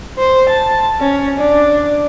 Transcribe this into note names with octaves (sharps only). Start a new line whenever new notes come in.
C5
A5
C#4
D4